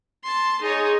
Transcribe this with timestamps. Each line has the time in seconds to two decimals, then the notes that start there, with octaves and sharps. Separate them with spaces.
0.24 A5 C6
0.62 D#4 G#4 C#5